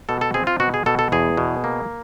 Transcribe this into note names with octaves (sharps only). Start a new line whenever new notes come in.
B2 A4
A4
C4 G#4
F4
B2 F#4
G#4
B2 A4
A4
E2 G#4
B2
A#3